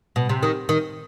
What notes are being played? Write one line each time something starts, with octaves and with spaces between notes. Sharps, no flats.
B2
C3
D#3
D#3